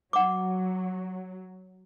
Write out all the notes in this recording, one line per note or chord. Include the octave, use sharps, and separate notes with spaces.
F#3 F#5 D6